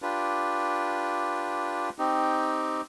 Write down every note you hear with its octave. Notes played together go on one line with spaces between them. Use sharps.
D4 F4 G4 B4
C4 D#4 G4